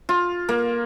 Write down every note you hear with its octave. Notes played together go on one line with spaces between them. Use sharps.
F4
A#3